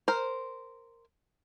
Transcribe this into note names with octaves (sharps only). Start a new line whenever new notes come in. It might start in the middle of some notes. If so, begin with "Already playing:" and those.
A#4 C5